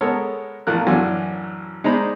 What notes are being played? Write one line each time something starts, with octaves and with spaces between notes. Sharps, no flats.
G#3 B3 A4 A#4 C#5
A#1 E2 A3 A#4 F#6
A1 F#2 E3 D4 F#4 G#5
G#3 D#4 C5 D5 A#5 B5